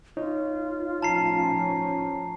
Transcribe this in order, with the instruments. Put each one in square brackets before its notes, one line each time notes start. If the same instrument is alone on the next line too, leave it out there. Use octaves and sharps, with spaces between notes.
[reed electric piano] D#4 C#5 [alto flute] F4
[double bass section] A2 F3 C#4 [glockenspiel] A5 A#5 C7